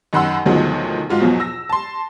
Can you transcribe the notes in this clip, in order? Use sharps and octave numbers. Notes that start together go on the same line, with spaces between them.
F#2 D#3 F#5 B5 C6 E6
D2 B2 D#3 F3 F#3 G#3
G#2 F4 F#4
E2 B2 F3 F#3
E6 A#6
A5 C6